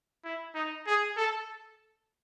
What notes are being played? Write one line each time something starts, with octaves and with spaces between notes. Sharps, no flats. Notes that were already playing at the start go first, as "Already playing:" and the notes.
E4
D#4
G#4
A4